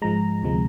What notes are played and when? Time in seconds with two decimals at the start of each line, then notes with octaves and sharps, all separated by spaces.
0.02 G#2 F3 G#3 A#5
0.43 D2 C3 F3 G#3